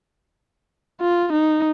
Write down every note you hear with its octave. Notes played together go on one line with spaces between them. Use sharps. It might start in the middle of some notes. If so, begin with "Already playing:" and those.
F4
D#4